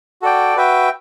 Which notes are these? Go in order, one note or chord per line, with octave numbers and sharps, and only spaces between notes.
F#4 A4 D5 G5
F#4 B4 E5 G5